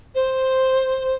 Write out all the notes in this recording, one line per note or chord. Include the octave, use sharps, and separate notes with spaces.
C5